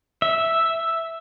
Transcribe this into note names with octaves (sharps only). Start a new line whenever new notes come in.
E5